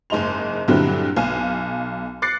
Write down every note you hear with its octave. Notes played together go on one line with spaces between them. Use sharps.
F#1 G#2 D#4 C6 F7
G2 A#2 D3 F#3 C4 E4
B1 F5 G#5
D6 F#6 A6 C7 C#7